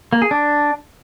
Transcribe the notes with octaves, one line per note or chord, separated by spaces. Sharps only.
A#3
G#4
D4